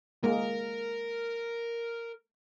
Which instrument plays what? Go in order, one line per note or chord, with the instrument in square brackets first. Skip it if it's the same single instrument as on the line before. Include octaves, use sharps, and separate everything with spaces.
[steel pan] G#3 A#3 [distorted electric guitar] A#4